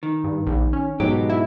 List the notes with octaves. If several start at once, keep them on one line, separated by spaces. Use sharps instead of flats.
D#3
G2
A#1
C#4
G#2 B2 F#3 G4
E4